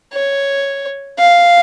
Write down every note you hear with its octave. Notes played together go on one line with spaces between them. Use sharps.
C#5
F5